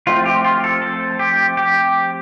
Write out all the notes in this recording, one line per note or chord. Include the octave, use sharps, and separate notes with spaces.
F3 A3 C4 F4
G4
F4
A4
A4
G4
G4